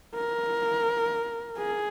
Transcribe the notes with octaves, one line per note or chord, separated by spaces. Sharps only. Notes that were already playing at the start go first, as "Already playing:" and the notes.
A#4
G#4